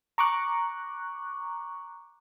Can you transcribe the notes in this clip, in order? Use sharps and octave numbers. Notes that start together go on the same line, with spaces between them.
A#5 C#6 D6 F#6